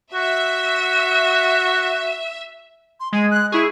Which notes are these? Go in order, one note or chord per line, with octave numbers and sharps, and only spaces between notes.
F#4 E5
C6
G#3 G#5
F#6
E4 G#4 C#6